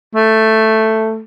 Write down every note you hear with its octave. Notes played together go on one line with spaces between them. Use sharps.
A3